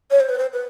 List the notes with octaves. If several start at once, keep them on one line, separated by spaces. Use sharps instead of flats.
C#5
C5
B4
C5
B4